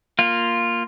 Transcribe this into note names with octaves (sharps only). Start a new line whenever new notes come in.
A#3 F4